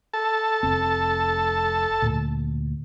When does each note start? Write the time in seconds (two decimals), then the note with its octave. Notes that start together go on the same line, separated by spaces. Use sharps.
0.13 A4 A5
0.63 F1 C4
2.02 D2 A#2